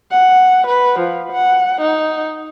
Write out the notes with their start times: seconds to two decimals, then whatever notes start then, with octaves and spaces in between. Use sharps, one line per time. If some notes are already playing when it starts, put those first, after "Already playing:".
0.11 F#5
0.67 B4
0.99 F3
1.32 F#5
1.81 D#4